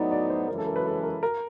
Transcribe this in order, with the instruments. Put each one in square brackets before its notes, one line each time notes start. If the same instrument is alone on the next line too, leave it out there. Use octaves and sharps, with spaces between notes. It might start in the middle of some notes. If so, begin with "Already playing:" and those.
Already playing: [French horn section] A2 F#3 B3 D#4 [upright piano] D5
[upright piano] D5
C5
[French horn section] F#2 C#3 E3 G#3 C#4 [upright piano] A#4
[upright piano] A4
A#4
B4
A4
A#4
A#4